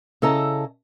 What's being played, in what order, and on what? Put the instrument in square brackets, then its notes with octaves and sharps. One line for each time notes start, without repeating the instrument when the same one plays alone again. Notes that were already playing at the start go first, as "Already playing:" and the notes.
[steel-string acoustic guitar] C#3 E4 A4 D#5 A5 A#5